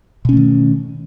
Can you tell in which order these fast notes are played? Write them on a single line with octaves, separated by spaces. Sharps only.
B2 C#4 A3 D#3